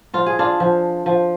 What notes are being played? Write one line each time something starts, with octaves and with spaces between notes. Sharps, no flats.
F3 F4
G#4
D4 F4
F3
F3